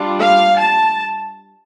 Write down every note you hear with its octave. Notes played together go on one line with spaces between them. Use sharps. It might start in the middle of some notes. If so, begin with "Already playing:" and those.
Already playing: G3 D4 F4
F5
A5